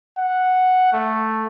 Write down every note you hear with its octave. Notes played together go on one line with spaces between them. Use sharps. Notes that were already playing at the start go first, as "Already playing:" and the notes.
F#5
A3